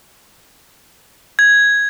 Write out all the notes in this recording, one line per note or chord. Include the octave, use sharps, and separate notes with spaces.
G#6